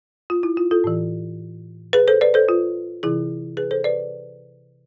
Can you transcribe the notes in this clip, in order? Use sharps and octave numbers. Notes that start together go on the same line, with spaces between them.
F4
E4
F4
F4 A4
A2 E3
G#4 B4
A4 C5
B4 D5
A4 C5
F4
C3 E3 E4 G#4
G#4 B4
A4 C5
B4 D5